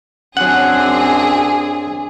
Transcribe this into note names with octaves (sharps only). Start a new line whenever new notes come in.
F#2 F#3 C4 D4 G#4 F#5